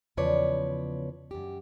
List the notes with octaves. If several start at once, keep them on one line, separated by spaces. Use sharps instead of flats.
E2 C#3 F3 B4 C#5 D5
F#2 G4